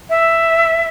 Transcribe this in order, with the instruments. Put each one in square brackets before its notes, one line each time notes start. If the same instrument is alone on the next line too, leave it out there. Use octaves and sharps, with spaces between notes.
[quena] E5